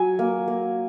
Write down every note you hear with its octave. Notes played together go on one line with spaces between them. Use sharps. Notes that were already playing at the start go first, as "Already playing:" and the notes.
Already playing: F#3 G#5
A#3
A#3